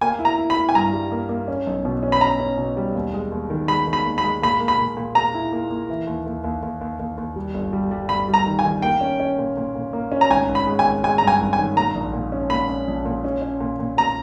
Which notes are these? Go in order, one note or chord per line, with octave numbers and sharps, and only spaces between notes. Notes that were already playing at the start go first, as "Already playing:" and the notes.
A#3 G#5
E4
A#5
E4
B5
E4
G#5
G2 A#5
G3
A#3
A#3
C#4
B1
B2
C#4
B5
C#4 A#5
C#4
B2
G3
D#2
G#3
D#2
D#3
G#3 B5
D#3
B5
D#2
B5
G#3
A#2 B5
A#3
B5
A#2
A#2
A#2 A#5
E4
A#3
A#3
E3
D#2
D#2
D#2
D#2
D#2
D#2
D#2
G3
G1
G3
G3
G2 B5
G3
A#5
D#3
G#5
D#3
A#3 G5
C#4
C#4
A#2
A#2
A#2
A#3
C#4
A#5
G#1 G#5
G#1
B5
G#3
G#5
G#1
G#3 G#5
G2 A#5
G#5
G#1
G#5
D#3
A#2 A#5
A#1
A#2
C#4
A#2 B5
C#4
A#1
A#2
C#4
C#4
A#2
A#2
A#2 A#5